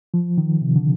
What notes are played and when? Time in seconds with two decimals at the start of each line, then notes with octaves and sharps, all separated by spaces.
0.14 F3
0.38 D#3
0.62 C3
0.76 D3